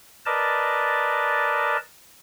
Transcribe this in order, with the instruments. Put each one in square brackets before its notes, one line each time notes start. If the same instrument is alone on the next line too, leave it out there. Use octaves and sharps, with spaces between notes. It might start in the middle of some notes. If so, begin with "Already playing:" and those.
[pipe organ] A#4 B4 D5 D#5 A5